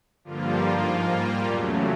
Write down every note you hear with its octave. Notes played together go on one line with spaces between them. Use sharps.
G2 D3 F3 G3 A#3 F4
G#2 F3 A#3
A#2 G3 A#3
E2 C#3 F#3 A3